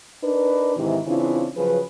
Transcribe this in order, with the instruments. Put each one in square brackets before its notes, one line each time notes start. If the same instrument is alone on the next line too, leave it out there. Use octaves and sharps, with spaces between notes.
[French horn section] D4 D#4 A#4 B4
G#2 C3 D#3 E3
C#3 E3 C4 D4 E4 F4
C#3 F3 F#3 G#4 B4